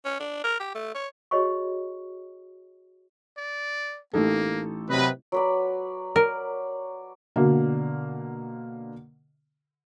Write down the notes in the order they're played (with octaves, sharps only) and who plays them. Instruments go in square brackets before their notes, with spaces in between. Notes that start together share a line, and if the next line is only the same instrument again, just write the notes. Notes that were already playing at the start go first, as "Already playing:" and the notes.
[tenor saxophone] C#4
D4
A#4
G4
A3
C#5
[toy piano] F#4 G#4 C#5 D#5 B5 C#6
[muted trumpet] D5
[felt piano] A1 D#4 A4 [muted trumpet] A#3
[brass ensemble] C3 F#3 B4 [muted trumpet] D#5
[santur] F#3 B4 D5
[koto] A#4 [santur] D5
[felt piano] B2 D3 A#3